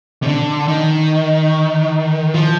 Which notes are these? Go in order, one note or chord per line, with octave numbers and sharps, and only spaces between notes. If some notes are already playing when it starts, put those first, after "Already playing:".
C3
D3
D#3
F3